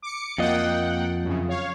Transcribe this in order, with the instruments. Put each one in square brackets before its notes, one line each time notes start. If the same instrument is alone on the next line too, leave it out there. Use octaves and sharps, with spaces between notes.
[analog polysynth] D6 C#7
[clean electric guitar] F2 F4 D#5 [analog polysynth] A#3 F#5 G5
[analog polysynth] F#2 C#3
C#5 F5